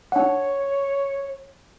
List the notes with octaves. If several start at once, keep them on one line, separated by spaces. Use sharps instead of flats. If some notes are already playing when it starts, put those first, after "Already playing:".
D4 C#5 F#5